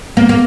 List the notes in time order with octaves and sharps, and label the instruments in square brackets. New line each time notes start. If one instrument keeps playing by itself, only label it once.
[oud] A#3 [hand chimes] B3
[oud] A#3